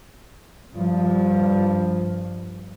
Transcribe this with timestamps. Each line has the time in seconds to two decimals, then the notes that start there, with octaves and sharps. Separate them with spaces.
0.73 G2 F3